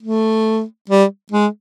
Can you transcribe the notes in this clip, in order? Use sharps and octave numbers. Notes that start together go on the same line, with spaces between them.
A3
G3
G#3